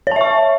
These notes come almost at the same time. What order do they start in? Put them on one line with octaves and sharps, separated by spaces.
C#5 A5 E5 C#6